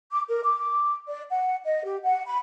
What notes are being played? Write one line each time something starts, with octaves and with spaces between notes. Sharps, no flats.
D6
A#4
D6
D5
F#5
D#5
G4
F#5
B5